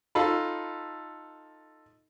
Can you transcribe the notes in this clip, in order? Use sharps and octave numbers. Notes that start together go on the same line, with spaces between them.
D#4 F4 A4 B5